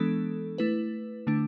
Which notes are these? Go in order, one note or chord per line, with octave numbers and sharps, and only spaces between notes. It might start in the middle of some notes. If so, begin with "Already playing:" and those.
Already playing: E3 G#3 B3 D4 A4
A3 E4 B4
D3 A3 D4